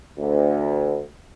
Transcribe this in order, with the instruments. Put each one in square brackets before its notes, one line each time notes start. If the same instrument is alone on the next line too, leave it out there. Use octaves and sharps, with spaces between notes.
[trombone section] D2